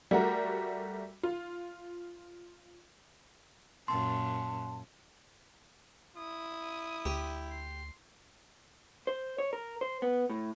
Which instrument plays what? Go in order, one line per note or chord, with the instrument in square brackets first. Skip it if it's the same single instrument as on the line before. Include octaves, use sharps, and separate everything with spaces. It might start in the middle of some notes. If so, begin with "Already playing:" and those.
[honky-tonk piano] G3 A3 F#4 A#4
F4
[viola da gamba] F#2 A#2 [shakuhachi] A5 [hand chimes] C6
[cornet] E4 [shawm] D#6
[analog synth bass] D2 [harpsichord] G4
[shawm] C6
[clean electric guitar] C5
C#5
A#4
C5
B3
A2